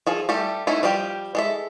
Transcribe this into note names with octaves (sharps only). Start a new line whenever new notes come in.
F3 G#4 A4
G3 A3 G4 A4
A3 C#4 D#4 E4
F3 G3 G4 G5
G#3 A4 E5